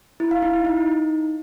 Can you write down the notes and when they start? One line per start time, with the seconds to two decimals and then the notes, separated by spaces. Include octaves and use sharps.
0.20 E4
0.31 F5
0.42 D#4
0.54 E4
0.65 D#4